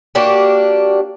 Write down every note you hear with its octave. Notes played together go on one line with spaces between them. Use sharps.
A#3 D4 F#4 G4